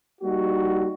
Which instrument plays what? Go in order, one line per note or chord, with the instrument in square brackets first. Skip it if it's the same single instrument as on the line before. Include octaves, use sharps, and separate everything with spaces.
[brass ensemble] G3 A#3 D#4 F#4